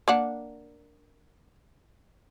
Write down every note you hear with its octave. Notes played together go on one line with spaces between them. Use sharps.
A#3 D4 F#5